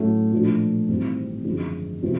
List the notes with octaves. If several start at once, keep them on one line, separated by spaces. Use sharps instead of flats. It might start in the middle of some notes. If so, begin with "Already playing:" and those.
Already playing: A2 F#3 A3 C#4
A#2 F3 A3 D4
G#1 G#2 E3 G3 C4
G#1 F#2 D3 F3 G#3
C3 F3 G#3 B3